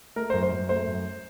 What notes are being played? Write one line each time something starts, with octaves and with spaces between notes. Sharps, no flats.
A3 A#4
F#2 C5
C5
F#2
A3 C5
F#2